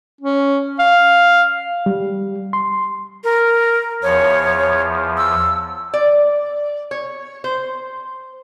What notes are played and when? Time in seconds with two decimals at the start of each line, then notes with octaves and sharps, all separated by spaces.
0.21 C#4
0.79 F5
1.86 G3
2.53 C6
3.24 A#4
4.03 E2 F3 C#5
5.17 E6
5.94 D5
6.91 C#5
7.44 C5